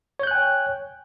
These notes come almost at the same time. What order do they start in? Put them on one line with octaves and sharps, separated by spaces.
C#5 G6 F#6 G#5 G5